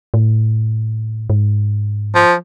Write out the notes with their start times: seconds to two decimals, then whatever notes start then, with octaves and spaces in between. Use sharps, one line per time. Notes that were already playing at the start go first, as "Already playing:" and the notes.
0.14 A2
1.30 G#2
2.15 F3